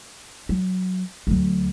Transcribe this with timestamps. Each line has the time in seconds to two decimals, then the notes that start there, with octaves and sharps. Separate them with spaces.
0.49 F#3
1.27 D2 F#3